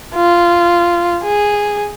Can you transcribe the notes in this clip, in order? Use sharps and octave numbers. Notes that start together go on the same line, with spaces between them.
F4
G#4